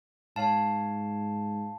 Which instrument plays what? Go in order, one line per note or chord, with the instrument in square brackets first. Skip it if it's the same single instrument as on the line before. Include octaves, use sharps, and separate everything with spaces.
[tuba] G#2 [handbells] C#5 F5 A5